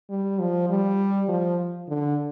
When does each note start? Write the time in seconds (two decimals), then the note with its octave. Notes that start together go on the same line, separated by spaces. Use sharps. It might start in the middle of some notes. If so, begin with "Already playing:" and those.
0.10 G3
0.40 F3
0.70 G3
1.29 F3
1.89 D3